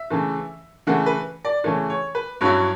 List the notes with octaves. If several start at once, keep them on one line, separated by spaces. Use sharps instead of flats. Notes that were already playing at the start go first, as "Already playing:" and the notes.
Already playing: E5
C#3 E3 A3
C#3 E3 A3 F#5
B4
D5
C#3 E3 A3 C#5
C#5
B4
G2 F#3 C#4 E4 C#5